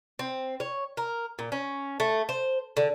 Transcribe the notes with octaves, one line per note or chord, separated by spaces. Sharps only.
C4
C#5
A#4
A#2
C#4
A3
C5
D3